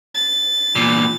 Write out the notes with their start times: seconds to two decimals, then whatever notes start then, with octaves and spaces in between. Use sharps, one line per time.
0.14 A6
0.75 E2 A#2